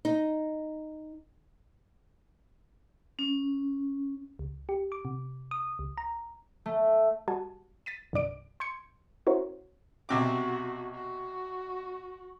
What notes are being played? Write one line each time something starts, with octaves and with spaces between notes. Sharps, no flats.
D#4
C#4
C#2
G4
D6
C3
D#6
C#2
A#5
A3
G3 F#4 G#5 A5
A6 B6 D#7
C2 G2 D5 D7
C6 G6 G#6 C#7
C#4 E4 F#4 A#4 C5 C#5
B1 C3 F#4 D6
F#4